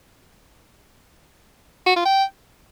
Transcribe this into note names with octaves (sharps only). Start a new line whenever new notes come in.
F#4
F4
G5